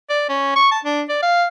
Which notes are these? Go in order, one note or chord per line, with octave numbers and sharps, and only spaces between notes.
D5
C#4
C#6
A5
D4
D5
F5